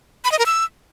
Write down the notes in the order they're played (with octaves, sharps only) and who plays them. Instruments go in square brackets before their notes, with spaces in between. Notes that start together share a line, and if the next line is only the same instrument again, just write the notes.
[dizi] B5
D#5
A#4
E6